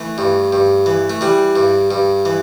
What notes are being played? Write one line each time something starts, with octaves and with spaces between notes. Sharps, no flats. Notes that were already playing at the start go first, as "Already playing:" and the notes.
Already playing: E3 A3
G2
G2
E3
A3
E3 G3
G2
G2
E3